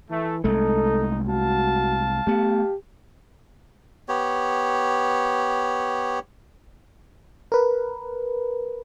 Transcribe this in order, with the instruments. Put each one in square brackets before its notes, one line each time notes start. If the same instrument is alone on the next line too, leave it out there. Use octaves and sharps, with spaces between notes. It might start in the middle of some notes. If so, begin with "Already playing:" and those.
[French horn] E3 [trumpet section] A3
[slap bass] C2 G#3 A3 [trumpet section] D#4 [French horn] A4
[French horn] F#4 [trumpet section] F5 A5
[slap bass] A3 B3 [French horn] G4
[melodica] B3 G4 C#5
[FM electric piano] A#4 B4